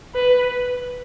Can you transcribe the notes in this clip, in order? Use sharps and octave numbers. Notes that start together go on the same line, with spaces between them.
B4